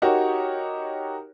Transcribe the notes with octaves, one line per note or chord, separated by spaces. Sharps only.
D#4 F#4 G4 A#4 C#5